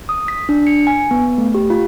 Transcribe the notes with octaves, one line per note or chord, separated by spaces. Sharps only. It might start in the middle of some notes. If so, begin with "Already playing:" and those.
D#6
B6
D4
C#7
G#5
B3
A3
G4
F4